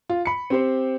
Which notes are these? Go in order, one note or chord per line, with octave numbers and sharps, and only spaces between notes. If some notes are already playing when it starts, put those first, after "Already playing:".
F4
B5 C#7
C4 G4 C5